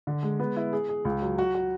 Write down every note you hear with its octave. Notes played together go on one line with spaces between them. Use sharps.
D3
G#3
B3
E4
G#4
G#4
C#2
F#3
F#4
F#4